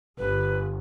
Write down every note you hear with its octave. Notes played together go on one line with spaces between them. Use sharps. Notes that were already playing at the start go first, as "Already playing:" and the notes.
G1 B4